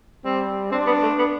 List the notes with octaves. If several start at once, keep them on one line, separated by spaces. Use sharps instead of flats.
G3 C4
C4 D4
B3
A3
B3